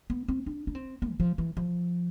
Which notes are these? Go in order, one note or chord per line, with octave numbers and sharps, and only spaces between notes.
B3
C4
D4
D4
C4
B3
E3
F3
E3
F3